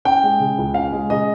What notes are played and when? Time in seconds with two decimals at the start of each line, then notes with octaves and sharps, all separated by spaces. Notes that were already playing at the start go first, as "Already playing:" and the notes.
0.05 C#4 G5
0.23 G#3
0.39 C#3
0.58 C#2
0.74 C#4 F5
0.92 G#3
1.10 C#3 D#5